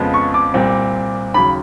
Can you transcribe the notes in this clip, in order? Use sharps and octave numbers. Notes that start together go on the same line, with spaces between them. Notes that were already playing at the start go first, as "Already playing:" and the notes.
Already playing: F2 C#3 F3 G#3 B3
C#6
D6
C2 A#2 G3 C4
D#2 C#3 F#3 B5